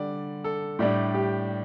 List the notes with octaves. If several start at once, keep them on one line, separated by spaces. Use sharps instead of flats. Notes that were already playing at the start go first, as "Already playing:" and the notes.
Already playing: D3 G3 D5
A4
A2 G3 D4 G4
G4